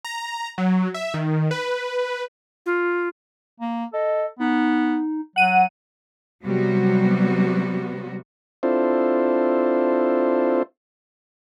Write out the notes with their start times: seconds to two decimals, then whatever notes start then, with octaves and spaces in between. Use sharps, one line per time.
0.05 A#5
0.58 F#3
0.94 E5
1.14 D#3
1.51 B4
2.66 F4
3.61 A#3
3.93 A4 D#5
4.40 B3 D#4
5.36 F#3 F#5 D#7
6.44 C3 F#3 G3 B3 F#4
8.63 C4 D4 E4 F4 A4 C5